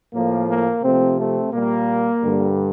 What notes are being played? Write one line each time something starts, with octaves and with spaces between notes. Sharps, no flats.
A2 F3 A#3
A#3
C3 F3 A3 C4
A3 C4
A#2 G3 A#3
G2 D3 G3